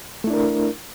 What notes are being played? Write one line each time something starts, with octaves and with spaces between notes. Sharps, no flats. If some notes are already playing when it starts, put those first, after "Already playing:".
A3 D4 E4 A#4